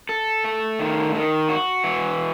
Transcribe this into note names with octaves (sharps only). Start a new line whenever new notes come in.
A4
A3
D#3
D#3
F#4
E3